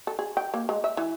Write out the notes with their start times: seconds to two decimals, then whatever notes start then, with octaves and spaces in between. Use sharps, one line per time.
0.07 A4
0.19 G#4
0.37 G5
0.54 A#3
0.69 G#3
0.84 E5
0.97 E3